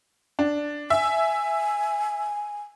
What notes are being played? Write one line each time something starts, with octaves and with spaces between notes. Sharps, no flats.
D4
E5 G#5